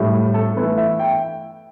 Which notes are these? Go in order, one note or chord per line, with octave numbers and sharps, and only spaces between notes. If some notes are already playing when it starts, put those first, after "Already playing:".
Already playing: A2 G3 E4
A4
E3 A3 E4 B4
E5
G5